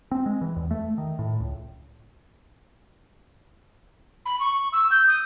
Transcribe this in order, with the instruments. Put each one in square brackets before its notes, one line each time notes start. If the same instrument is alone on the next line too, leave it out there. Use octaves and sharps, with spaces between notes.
[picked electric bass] C4
G#3
E3
E2
A3
D#3
A2
C#2
[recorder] B5
C#6
E6
G6
D#6